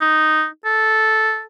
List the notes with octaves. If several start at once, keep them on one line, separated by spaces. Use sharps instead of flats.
D#4
A4